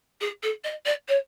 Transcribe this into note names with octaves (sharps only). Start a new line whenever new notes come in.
G#4
A4
D#5
D5
C#5